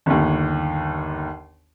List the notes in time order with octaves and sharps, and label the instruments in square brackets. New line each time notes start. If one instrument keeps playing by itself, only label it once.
[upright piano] G1 D#2